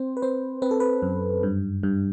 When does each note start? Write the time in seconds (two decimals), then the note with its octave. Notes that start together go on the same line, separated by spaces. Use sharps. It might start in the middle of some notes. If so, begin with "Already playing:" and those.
Already playing: C4 C5
0.17 B4
0.22 C4 C5
0.62 C4 B4
0.71 A4
0.80 B4
1.02 F#2
1.43 G2
1.83 G2